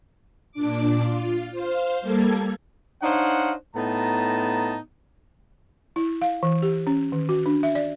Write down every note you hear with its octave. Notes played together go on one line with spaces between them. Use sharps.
A#2 D4 D6
F4
C5 F5
G3 A#3 A4 G#6
D4 D#4 C5 C#5 F5 F#5
A2 B3 D#4 A5 A#5
E4
F5
E3
G4
C#4
D#3
F#4
D4
E5
D5